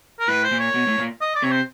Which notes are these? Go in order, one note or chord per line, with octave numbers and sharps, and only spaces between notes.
A#4
A2 B4
C5
A#2
C#5
B2
A2
A#2
D#5
D5
C3 C#5
C5